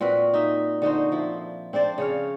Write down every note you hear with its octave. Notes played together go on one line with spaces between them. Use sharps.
A#2 C4 F#4 B4
D#4 E5
D3 D#4 F#4 C5
F3 E4
C4 D4 C5 D5
C#3 C#5 F5